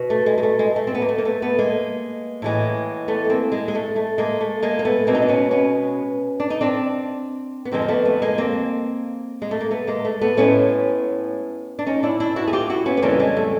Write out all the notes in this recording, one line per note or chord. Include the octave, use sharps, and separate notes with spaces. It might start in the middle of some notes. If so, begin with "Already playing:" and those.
Already playing: B2
A3
G#3
G#3
A3
G#3
A3
C4
B3
A#3
A3
A#3
A3 B3
A3 B3
G#3 A#3
A2 E3 G#3
A3 B3
B3
A#3 C4
G#3 A#3
G#3
A3
A3
G#3 A#3
A3
G#3 A#3
A#3
A3 B3
B2 G#3 A#3 C4
D#4
D4
B3 C#4
B3 C#4
D4
D#4
C4 D4
B3
F2 D3 F3 G#3 A#3 C4
A#3
A3 B3
A3 B3
G#3 A#3
A#3 C4
G#3
A3
A#3
A3 B3
G#3 A#3
A3
A3 B3
A2 F3 G#3 B3 C#4
D4
C#4 D#4
D4 E4
D4 E4
E4 F#4
G#4
F4 G4
E4 F#4
B3 C#4
B3
F2 C#3 E3 G3 A#3 C4
G#3 A#3
A3